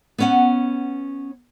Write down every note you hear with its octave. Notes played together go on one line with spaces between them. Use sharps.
B3 C#4 F#5